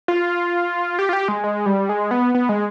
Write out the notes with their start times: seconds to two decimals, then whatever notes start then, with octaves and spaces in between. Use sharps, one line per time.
0.08 F4
0.99 G4
1.09 F4
1.13 G4
1.28 G#3
1.44 G#3
1.66 G3
1.89 G#3
2.11 B3
2.35 B3
2.49 G#3